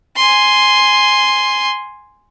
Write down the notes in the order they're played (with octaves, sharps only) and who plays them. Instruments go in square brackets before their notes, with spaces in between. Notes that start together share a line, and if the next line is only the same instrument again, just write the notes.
[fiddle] G#5 C6